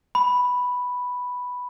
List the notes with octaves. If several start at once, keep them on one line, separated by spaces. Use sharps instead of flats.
B5